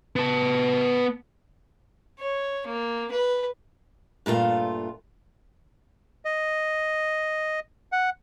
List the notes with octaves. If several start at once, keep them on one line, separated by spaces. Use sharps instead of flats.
B3 A5
C#5
A#3
B4
G2 A#2 A3 F4
D#5
F#5